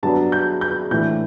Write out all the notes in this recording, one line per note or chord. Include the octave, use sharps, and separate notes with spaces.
G2 F#3 B3 D4 A5
G6
G6
A2 E3 A3 D4 G6